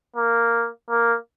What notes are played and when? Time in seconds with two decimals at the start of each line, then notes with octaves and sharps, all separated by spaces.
0.17 A#3
0.90 A#3